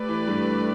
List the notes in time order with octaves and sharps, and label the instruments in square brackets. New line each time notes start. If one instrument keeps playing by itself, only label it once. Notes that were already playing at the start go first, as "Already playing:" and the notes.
Already playing: [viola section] A3 G4 B4 D5
[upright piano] E3
G2 G3
E3